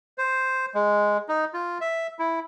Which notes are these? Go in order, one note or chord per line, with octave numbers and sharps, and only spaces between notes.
C5
G#3
D#4
F4
E5
E4